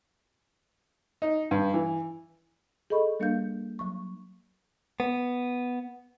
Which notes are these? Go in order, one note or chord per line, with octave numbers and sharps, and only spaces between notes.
D#4
G2
E3
G#4 A4 D#5 B5 C#6
G3 A#3 D4 A#4 F5 G6
F#3 C#6
B3